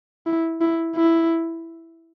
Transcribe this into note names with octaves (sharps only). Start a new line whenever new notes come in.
E4
E4
E4